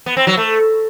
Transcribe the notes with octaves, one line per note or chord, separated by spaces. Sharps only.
B3
C4
F#3
A3